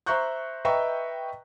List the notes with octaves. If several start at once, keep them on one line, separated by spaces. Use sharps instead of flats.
C5 E5 A#5 C#6 F#6 G6
B4 D#5 E5 G5 A#5 C#6